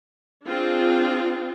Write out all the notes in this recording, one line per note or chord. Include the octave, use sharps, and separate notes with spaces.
C4 D4 F4 G#4